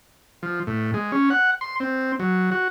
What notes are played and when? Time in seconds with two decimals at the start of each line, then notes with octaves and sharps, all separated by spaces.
0.43 F3
0.67 A2
0.94 G#3
1.12 C#4
1.30 F#5
1.61 C6
1.80 C4
2.20 F#3
2.52 F#4